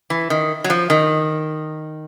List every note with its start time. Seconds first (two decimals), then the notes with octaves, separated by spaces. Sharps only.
0.10 E3
0.30 D#3
0.64 F#3
0.70 F3
0.90 D#3